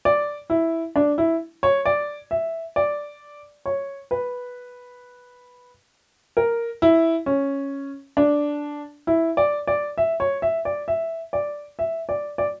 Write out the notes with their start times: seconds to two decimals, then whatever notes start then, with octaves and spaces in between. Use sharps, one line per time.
0.05 D5
0.50 E4
0.96 D4
1.18 E4
1.63 C#5
1.85 D5
2.31 E5
2.76 D5
3.66 C#5
4.11 B4
6.37 A#4
6.82 E4
7.26 C#4
8.17 D4
9.07 E4
9.37 D5
9.67 D5
9.98 E5
10.20 C#5
10.42 E5
10.65 D5
10.88 E5
11.33 D5
11.79 E5
12.09 D5
12.38 D5